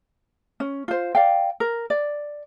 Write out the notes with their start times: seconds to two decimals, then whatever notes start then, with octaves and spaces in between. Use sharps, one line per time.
0.60 C#4
0.88 F4 C5
1.15 D5 F5 G5
1.60 A#4
1.90 D5